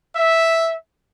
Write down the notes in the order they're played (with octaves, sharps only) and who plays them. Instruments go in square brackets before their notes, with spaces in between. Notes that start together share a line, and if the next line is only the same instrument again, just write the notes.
[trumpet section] E5